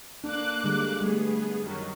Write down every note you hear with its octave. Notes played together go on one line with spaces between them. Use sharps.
A#3 D4 D6 F#6
D3 G3 G#3
G3 A3 B3 G#4
F#2 D#3 F#3